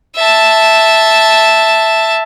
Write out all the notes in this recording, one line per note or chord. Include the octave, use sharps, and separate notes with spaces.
E5 A5